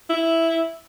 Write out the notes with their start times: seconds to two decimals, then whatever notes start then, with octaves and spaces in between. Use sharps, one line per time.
0.10 E4